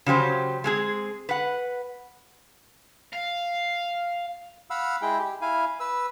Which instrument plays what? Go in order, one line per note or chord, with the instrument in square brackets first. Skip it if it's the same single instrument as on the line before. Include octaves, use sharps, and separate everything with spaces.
[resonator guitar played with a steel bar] C#3 F#3 G4 C5
G#3 C4 G#4
B4 F#5
[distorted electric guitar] F5
[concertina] F5 F#5 B5 E6
G#3 E4 G#4 G5
G4
E4 F5 G#5
B4 E6